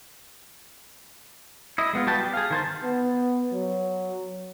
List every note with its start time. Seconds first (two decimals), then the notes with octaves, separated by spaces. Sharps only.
1.78 E4 D#5
1.93 G#3 B3 F4
2.07 G3 F#4 B4 G5 A5
2.19 G4
2.34 G#4 F5
2.51 D#3 C5 A5
2.83 B3
3.53 F#3